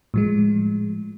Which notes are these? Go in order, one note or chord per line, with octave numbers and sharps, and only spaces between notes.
A2 F3 G#3